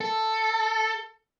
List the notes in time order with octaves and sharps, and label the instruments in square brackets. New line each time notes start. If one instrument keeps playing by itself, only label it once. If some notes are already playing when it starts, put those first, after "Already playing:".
[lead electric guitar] A4